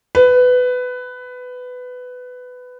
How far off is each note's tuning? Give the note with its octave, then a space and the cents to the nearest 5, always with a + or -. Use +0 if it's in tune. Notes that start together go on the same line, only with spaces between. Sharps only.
B4 +15